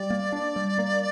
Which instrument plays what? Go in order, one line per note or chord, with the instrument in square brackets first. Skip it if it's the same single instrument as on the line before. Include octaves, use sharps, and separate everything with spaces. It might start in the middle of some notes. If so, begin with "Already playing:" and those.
Already playing: [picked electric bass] G3 [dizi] D5
[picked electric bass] A#3
D4
G3
A#3